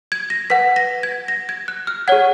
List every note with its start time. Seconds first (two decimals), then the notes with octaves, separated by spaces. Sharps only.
0.12 G#6
0.30 A#6
0.50 B4 F#5 B6
0.76 A#6
1.03 G#6
1.28 A#6
1.49 G#6
1.68 F#6
1.87 F6
2.08 G#4 C#5 F#5 G#6